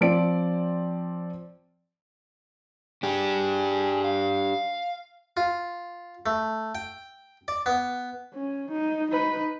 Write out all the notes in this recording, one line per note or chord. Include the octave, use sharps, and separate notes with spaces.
F3 C4 D5 D7
D4 G4 G#4
F5
F4
A3
G5
D5
B3
C#4
D#4
D#4 B4